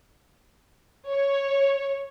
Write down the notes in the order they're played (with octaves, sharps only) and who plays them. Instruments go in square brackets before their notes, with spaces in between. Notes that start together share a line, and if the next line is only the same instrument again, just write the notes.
[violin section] C#5